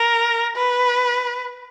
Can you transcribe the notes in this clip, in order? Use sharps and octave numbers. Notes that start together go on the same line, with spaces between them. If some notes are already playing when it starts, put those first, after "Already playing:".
Already playing: A#4
B4